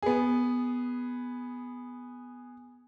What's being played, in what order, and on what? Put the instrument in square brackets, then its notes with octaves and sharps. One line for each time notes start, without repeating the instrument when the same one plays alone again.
[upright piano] B3 G#4